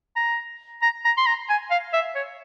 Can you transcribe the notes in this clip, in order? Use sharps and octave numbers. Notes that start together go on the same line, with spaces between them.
A#5
A#5
A#5
C6
A#5
G#5
F5
E5
C#5